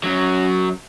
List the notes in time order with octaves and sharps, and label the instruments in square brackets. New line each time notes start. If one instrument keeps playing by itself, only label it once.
[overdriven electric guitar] F#2 F#3